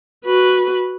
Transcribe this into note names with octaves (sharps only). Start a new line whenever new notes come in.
F#4 B4